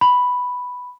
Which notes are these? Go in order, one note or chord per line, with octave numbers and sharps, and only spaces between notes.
B5